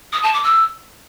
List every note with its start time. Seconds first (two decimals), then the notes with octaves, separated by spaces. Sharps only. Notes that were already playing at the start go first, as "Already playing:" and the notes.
0.13 D#6
0.23 A5
0.33 D6
0.44 E6